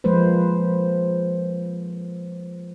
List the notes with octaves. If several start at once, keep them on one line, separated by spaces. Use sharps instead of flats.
F3 G#3 A#3 B4 C5